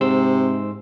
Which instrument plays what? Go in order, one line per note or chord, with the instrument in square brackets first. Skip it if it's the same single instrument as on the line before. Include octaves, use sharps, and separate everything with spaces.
[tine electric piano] G#2 C6 E6 [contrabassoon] C3